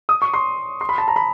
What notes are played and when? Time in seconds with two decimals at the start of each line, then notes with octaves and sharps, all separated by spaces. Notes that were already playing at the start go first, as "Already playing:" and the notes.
0.09 D#6
0.22 C#6
0.34 C6
0.81 C6
0.89 B5
0.98 A5
1.08 A#5
1.16 B5